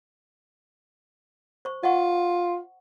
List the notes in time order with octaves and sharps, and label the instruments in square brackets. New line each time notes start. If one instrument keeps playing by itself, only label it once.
[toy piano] C5 C#6
[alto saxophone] F4 [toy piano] D#5 F#5 C#6